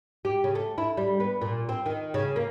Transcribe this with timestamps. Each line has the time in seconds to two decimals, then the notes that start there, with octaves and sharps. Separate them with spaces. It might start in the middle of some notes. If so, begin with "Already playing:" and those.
0.25 G4
0.44 C#3
0.55 A3
0.78 E4
0.97 G3
1.20 B3
1.41 A#2
1.69 C4
1.86 D#3
2.14 C#3
2.36 A#3